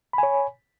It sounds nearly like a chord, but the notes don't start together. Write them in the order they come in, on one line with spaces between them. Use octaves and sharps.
B5 G#5 C#5